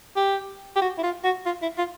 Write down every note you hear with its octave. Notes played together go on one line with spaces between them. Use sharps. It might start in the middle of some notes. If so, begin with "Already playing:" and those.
G4
G4
F#4
E4
F4
F#4
F4
E4
F4